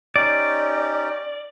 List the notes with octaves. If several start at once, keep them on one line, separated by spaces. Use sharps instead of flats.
C#4 D#4 G4 D5